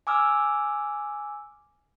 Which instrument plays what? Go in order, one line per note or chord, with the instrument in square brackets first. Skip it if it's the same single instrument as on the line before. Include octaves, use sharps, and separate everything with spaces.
[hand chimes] G#5 D6 E6 F6